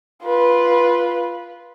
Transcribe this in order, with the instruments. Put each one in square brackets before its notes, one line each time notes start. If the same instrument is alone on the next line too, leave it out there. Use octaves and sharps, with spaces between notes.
[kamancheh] F4 B4